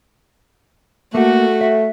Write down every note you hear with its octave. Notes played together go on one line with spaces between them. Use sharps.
A3 A#3 F#4
E5